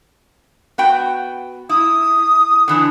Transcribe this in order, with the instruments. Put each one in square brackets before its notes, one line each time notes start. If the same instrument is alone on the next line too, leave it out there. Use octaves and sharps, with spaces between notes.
[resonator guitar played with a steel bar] B3 F#4 G5
[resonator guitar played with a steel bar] E4 [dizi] D#6
[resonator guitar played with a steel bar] D3 E3 D4